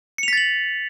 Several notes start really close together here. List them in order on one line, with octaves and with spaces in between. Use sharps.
C#7 F7 B6 A6 F#7